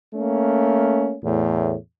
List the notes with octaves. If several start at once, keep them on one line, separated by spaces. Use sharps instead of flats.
A3 A#3 C#4
E2 A2